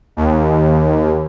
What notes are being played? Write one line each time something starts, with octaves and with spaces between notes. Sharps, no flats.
D#2